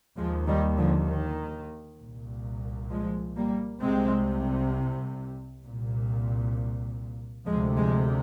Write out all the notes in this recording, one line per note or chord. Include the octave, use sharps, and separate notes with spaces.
D#2 F3 G#3
D#3 G3
D3 F3
D#3
C2 A#2
F3 G#3
G3 A#3
C2 C3 G#3 C4
C2 A#2
D2 C3 F3 G#3
F3 G#3